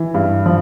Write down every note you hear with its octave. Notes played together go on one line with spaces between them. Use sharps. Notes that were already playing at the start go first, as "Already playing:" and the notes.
Already playing: E3
G2
F3